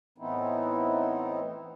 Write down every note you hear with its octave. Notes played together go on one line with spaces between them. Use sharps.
A2 E3 B3 C4 D#4 E4